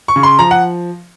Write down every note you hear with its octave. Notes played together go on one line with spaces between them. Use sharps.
C#6
C#3
C6
F3 A#5
F#5